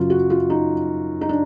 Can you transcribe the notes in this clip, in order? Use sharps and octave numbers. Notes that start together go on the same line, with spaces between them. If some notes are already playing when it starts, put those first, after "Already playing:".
Already playing: F#2 C#3 F#3 F4
F#4
F4
D#4
D#4
D4